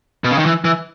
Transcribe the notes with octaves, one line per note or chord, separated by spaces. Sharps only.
B2
C#3
D#3
E3
E3